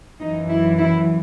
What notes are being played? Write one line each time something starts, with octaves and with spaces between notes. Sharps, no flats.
F#2 E3 D#4
E4
E4